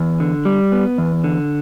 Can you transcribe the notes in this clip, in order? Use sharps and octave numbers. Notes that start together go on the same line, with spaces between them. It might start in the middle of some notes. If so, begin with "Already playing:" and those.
Already playing: E2
D3
G3
B3
E2
D3